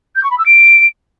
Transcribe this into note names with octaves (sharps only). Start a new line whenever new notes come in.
G6
C#6
B5
E6
D7